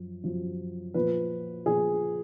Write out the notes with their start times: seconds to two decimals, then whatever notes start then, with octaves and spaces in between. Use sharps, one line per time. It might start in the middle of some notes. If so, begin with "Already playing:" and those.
Already playing: F#2 F3
0.24 F#2 F3
0.94 A#2 F3 B4
1.66 A#2 F3 G#4